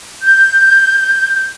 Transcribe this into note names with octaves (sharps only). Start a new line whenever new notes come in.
G6